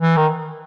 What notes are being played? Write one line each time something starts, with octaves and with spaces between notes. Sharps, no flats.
E3
D#3